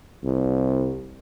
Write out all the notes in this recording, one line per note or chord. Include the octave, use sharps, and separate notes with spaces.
C2